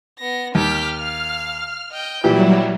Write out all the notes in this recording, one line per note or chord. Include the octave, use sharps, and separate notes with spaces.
B3 A#6
D#2 G4 F6 B6
F5
D#5 G5
A#2 E3 F#3 G3 E4 G4